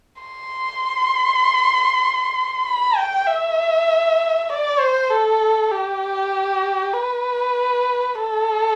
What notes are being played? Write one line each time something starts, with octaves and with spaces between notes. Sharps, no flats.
C6
B5
G5
E5
D5
C5
A4
G4
B4
A4